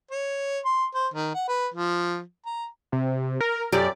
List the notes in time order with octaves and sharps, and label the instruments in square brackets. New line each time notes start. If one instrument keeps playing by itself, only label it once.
[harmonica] C#5
C6
C5
D#3
F#5
B4
F3
A#5
[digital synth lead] C3
A#4
[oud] F#2 G4 [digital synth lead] D5